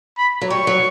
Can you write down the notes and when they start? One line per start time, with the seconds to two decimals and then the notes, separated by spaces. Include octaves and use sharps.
0.18 B5
0.41 F#3
0.50 G3 C#6
0.67 F#3